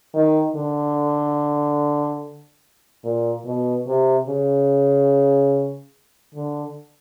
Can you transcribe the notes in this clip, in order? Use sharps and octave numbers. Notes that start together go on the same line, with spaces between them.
D#3
D3
A#2
B2
C3
C#3
D3